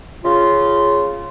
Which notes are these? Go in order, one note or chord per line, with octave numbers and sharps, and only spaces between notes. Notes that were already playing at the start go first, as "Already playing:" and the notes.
C#3 F4